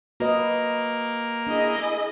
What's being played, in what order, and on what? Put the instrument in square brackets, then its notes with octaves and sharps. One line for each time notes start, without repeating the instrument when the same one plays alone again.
[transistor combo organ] A#3 [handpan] F#4 B4 D#5
[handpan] D4 [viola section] E4 G#4 D#5